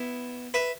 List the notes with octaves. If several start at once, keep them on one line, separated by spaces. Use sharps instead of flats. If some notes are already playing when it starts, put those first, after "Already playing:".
Already playing: B3 E4
B4 E5